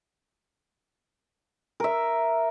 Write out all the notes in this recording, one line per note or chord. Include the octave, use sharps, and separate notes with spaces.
A#4 E5